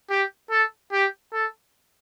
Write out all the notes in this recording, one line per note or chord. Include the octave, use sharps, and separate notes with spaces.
G4
A4
G4
A4